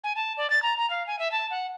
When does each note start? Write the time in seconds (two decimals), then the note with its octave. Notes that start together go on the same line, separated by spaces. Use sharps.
0.04 G#5
0.16 A5
0.37 D5
0.50 A6
0.63 A#5
0.78 A#5
0.90 F5
1.07 G#5
1.19 E5
1.32 A5
1.51 F#5